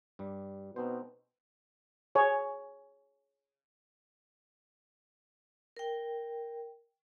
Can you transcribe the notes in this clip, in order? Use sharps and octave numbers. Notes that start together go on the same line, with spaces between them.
G2 G3
B2 C4 D#4 C5
G#4 C#5
A#4 G5